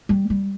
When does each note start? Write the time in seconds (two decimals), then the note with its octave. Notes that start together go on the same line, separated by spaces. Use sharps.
0.09 G3
0.30 G3